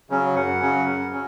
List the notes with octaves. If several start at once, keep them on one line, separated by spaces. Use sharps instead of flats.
C#3 F#3 C#4
F#2 F#5
C#3 F#3 C#4
F#2
F#3 C#4